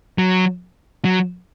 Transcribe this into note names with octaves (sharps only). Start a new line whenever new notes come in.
F#3
F#3